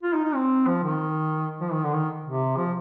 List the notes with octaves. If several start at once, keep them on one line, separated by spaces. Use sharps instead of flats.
F4
D#4
D#4
C4
F3
D#3
F3
D#3
D3
D#3
C3
F3